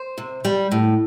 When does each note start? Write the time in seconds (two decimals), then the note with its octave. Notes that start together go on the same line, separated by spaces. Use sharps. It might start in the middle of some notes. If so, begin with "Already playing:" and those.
Already playing: C5
0.18 C3
0.45 G3
0.72 A2